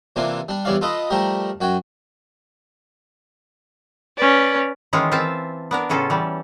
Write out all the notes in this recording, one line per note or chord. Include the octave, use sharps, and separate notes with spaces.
C3 E3 A#3 D4 F4
G3 D4
E2 E3 G3 C#5 D5 F5
F4 A4 B4 D#5
F3 G3 A3 G4 A#4
F#2 F#4 G5
C#4 B4 D5
D#3 E3 G#3 C#4 F4 G#4
E3 C4 F4 E5 F5 A5
B3 D4 A#4
A2 C#3 C#4 F4 A4
E3 G3